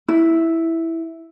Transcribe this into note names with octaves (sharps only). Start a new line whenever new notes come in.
E4